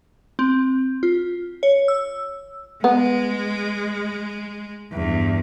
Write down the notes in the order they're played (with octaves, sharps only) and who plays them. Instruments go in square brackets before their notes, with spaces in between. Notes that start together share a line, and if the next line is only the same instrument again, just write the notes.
[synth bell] C4
F4
C#5
E6
[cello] G#3 [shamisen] B3
[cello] E2 G2